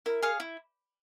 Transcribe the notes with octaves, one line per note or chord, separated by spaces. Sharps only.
E4 A#4
G#4 C#5 F5
E4